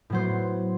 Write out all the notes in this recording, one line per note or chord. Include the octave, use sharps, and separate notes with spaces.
A2 F#3 B3 C5